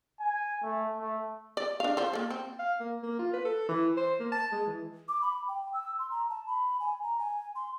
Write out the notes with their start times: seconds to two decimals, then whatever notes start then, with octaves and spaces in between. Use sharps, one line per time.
0.20 G#5
0.63 A3
0.98 A3
1.57 D5
1.80 D4 F5
1.97 F3 C5
2.13 A#3 A4
2.31 C4
2.59 F5
2.80 A#3
3.03 A#3
3.19 F4
3.34 B4
3.45 A4
3.69 E3
3.97 C5
4.20 A#3
4.32 A5
4.52 G#3
4.67 E3
5.08 D6
5.22 B5
5.48 G5
5.74 E6
5.99 C6
6.11 A#5
6.30 A5
6.47 B5
6.80 G#5
7.03 A#5
7.19 G#5
7.56 C6